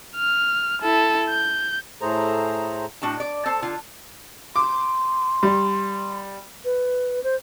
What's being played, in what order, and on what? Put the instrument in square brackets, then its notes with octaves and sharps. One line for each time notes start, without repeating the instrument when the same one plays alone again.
[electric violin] F6
E4 A4
G6
[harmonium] A2 A3 G#4 A4 C5 A#5
[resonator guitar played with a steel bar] A2 D4 F#4 A5
D5
A4 C5 A5
D3 F4
[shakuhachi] C6 [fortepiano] D6
[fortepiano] G3
[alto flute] B4
C5